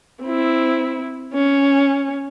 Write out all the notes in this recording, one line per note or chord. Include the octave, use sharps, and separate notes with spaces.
C4 E4
C#4